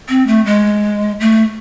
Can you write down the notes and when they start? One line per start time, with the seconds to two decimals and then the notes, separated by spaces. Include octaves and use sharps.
0.09 C4
0.27 A3
0.45 G#3
1.20 A3